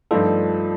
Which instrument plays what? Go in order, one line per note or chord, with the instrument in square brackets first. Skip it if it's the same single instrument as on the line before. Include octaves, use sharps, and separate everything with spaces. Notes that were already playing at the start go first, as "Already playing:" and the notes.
[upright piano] G2 F3 A3 D#4 [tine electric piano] F4 A4